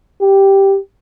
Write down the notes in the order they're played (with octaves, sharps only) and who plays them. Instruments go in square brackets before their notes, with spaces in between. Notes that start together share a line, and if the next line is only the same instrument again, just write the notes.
[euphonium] G4